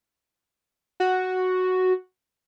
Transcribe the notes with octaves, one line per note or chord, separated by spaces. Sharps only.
F#4